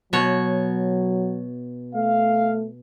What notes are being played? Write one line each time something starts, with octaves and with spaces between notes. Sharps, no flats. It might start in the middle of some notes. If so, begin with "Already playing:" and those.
B2 F#3 C#5
A3 F5